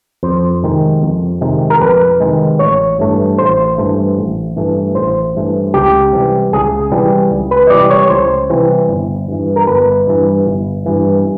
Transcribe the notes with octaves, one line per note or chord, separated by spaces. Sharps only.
F2 C5
C3 D#3 G#3
F2
C3 D#3 G#3
A#4
F2 B4
C3 D#3 G#3
A1 C#5
G2 E3 A3
A1 C5
G2 E3 A3
A1
G2 E3 A3
A1 C5
G2 E3 A3
C#2 G4
C3 E3 G3
C#2 G#4
C3 E3 G3
C#2
B4
D#5
C3 E3 G3 D5
C#5
C#2 C5
C3 E3 G3
G1
G2 E3
A#4
G1 B4
G2 E3
G1
G2 E3